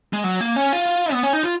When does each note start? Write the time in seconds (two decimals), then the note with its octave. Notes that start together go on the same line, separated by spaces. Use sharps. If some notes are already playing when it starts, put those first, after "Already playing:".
0.13 G#3
0.24 F#3
0.41 A#3
0.56 C#4
0.73 F4
1.13 B3
1.23 C#4
1.33 D#4
1.43 F4